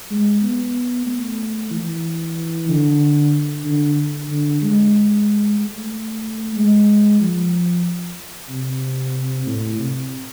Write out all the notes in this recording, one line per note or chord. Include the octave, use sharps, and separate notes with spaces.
G#3
B3
A3
E3
D3
D3
D3
G#3
A3
G#3
F3
C3
A2
C3